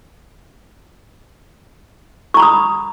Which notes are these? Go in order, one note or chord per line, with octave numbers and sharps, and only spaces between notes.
A#5 B5 C#6 D#6